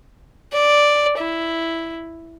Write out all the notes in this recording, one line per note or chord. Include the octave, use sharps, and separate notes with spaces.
D5
E4